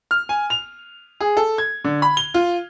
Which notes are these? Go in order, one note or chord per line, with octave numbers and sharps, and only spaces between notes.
F6
G#5
F7
G#4
A4
G#6
D3
B5
G7
F4